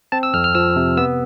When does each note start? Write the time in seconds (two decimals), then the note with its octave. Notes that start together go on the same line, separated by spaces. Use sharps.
0.12 C4 A5
0.23 E6
0.34 F2 F6
0.44 F6
0.55 F3 E6
0.76 C3
0.97 B3 E6